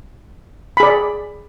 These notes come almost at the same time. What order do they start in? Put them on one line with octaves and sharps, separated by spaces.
B5 G#4 D5